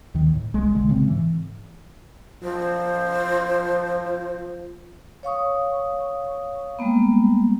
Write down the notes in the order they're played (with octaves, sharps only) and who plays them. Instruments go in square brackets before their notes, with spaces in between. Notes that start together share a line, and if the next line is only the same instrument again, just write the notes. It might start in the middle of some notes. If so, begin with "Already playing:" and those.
[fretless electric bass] D#2 D#3
A2
C2 G#3
A#1 A#2 D3 G#3
A#2 C#3 G#3 C4
G#2 E3
[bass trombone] F3 [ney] C5
[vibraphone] C#5 F5 C#6 D#6
G3 G#3 A#3 B3